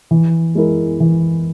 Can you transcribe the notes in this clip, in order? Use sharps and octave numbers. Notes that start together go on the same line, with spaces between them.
E3
G#3 E4 A#4
E3